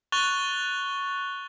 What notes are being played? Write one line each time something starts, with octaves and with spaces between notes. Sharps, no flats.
C#6 F#6 A6 F7 G7